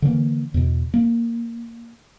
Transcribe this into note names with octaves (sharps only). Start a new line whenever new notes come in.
D3 E3 G3 A#3
E2 B2
A#3